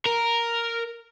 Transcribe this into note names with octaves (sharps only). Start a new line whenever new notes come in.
A#4